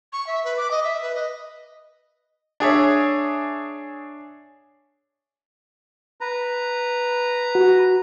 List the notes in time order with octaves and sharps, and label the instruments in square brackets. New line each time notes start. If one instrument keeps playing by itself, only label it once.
[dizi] C#6
E5
B4
D6
D#5
E5
B4
D#5
[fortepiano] D4 G#4 C#5 E5
[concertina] B4 A#5
[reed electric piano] F#4